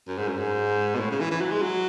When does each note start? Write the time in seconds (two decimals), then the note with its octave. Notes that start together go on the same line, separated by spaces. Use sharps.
0.08 F#2
0.18 G#2
0.28 F#2
0.39 G#2
0.95 B2
1.00 A2
1.11 C#3
1.21 E3
1.31 E3
1.41 F#3
1.51 G#3
1.62 F#3